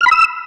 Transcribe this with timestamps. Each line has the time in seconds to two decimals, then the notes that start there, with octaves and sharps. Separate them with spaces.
0.01 F6
0.06 B5
0.11 E6